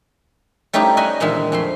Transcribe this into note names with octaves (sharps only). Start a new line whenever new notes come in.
G3 A3 C#4 D#4 E4 G4
C#5 D#5 E5 F#5 G#5 A#5
E2 A#2 D3 D#3 G#3 E5
F2 A3 C6